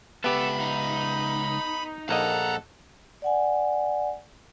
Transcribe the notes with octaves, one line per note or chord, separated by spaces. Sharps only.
C#2 B3 G4 A4 E5 B5
D#4
A#1 A#3 A4 D#5 F#5 A5 A#5
D5 F#5 G#5